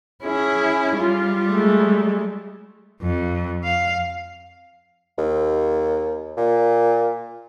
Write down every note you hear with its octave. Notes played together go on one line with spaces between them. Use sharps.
C#4 E4 G#4
G3 F4
G#3 A3
F2
F5
D#2
A#2